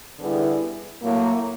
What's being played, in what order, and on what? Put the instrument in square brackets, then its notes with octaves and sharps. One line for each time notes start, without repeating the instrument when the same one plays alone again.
[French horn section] D3 G3 B3 E4 G#4
A2 F#3 A#3